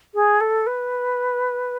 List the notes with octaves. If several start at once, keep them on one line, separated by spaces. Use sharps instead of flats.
G#4
A4
B4